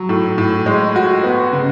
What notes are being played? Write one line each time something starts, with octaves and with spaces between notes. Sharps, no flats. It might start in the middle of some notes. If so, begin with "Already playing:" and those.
Already playing: F#3
A2
A2
G#3
F#4
B3
C#3